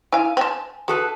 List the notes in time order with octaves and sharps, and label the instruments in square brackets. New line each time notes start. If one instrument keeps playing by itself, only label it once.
[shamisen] E4 F5 [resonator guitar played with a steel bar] G#5
[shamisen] C4 A5
[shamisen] F#4 [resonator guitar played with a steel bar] G#4 A4 B4